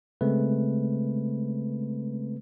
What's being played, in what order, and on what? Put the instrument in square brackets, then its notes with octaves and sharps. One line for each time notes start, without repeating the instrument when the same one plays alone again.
[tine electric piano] C#3 G#3 A3 C4 B4